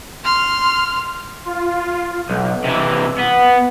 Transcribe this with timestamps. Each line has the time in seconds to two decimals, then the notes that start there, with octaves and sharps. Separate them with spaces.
0.24 C6 F6
1.45 F4
2.30 B1
2.64 C3 E3
3.18 B3